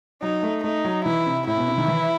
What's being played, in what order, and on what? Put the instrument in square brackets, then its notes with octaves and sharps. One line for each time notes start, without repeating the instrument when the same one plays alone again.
[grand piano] F#3 [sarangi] D#4
[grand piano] A3
[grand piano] A3 [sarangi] D#4
[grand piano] F#3
[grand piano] E3 [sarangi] E4
[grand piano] C3
[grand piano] A2 [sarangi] E4
[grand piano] B2
C3
D#3
E3